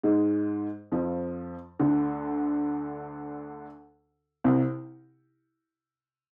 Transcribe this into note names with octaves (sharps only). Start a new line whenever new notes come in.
G#2 G#3
F2 F3
D2 D3
C2 C3